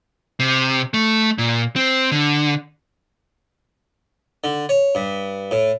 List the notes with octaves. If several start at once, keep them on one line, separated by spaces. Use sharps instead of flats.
C3
A3
A#2
C4
D3
D3
C#5
G2
A2